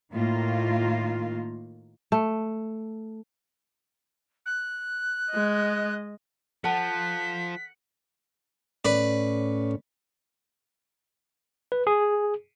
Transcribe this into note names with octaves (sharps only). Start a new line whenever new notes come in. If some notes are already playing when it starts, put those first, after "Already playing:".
A2 D#3 A#3 F4
A3
F#6
G#3 D#5
F3 A4 F#5 A5 B6
A2 C#4 B4 D5
B4
G#4